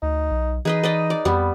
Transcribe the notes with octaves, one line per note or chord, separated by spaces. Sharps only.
D2 D#4
B1
E3 D#4 G#4 B4 D#5
B4 D5 D#5
D5
F2 G3 B3